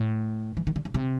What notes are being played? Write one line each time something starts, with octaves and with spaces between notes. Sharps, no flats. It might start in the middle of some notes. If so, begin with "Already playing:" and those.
Already playing: A2
E3
D#3
D3
C#3
C3